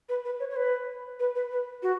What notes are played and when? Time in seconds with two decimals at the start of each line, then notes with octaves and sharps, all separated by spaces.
0.09 B4
0.25 B4
0.40 C#5
0.50 C#5
0.56 B4
1.19 B4
1.35 B4
1.51 B4
1.83 F#4